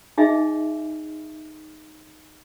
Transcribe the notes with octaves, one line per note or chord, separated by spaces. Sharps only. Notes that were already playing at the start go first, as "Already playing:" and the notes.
D#4 G#4 D#5 E5 G#5